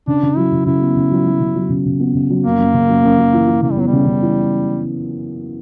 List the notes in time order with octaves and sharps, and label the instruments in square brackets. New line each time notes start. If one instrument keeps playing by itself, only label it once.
[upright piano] C#3 [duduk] D4
[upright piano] C#3
[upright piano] F#3 [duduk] E4
[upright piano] C#3
[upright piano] C#3 [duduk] E4
[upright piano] B3
C#3
F#3
F#3
C#3
F#3
C#3
C#3
B3
C#3
F#3
[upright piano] F#2 [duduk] A#3
[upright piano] F#2
C#3
F#2
F#2
F#2
E3
E3
[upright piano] C#3 [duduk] A#3
[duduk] G3
[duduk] F#3 [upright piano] B3
[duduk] G3
[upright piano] C#3
C#3
E3